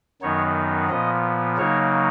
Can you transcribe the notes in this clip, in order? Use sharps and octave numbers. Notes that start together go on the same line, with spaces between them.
F#2 D#3 F#3 B3 D#4 C#5
A#2 F3 B3 D#5
C#3 F#3 A#3 D#4 C#5